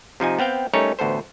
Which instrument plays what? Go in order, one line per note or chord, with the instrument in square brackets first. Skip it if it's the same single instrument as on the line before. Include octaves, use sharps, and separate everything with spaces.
[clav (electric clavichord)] C3 F3 D#4 G#5
B3 C4 F5 G5
G3 A3 C#4 D#4 A#4 C#5
A1 D2 B3 A4 C5